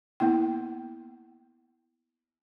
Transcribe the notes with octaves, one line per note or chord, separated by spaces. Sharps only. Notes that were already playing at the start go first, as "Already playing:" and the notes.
A#3 B3 E4 G5